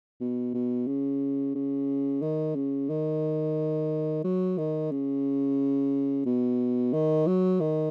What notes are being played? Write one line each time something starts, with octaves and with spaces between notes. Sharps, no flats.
B2
B2
C#3
C#3
D#3
C#3
D#3
F#3
D#3
C#3
B2
D#3
F#3
D#3